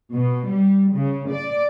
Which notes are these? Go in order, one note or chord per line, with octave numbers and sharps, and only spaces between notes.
B2
G3
C#3
D5